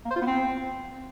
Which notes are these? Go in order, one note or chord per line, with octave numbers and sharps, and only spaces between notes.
A#3
C5
F4
B3
C4